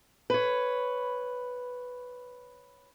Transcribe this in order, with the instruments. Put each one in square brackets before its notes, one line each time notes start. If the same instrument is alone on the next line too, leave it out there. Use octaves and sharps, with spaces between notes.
[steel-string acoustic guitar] B4 C#5